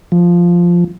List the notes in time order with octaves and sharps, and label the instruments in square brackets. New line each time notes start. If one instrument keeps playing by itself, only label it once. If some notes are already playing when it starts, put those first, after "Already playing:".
[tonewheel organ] F3